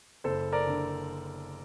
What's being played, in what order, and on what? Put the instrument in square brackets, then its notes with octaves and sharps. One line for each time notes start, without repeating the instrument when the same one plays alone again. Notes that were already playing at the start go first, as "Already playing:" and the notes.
[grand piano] F#1 A4 C5
A#4 D5
D3